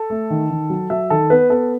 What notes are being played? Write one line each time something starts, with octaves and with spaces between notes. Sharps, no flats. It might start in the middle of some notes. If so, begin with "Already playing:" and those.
Already playing: A4
A3
D#3
D#3
F#3
F#3 E5
D#3 A4
B3 B4
B3 A4